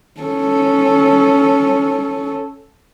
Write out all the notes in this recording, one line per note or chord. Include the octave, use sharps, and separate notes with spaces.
C#4 A4